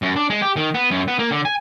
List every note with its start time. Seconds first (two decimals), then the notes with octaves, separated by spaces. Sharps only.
0.02 F#2
0.16 D4
0.30 G#3
0.42 G4
0.56 D#3
0.74 B3
0.91 F#2
1.08 B3
1.19 A#3
1.31 D3
1.45 G#5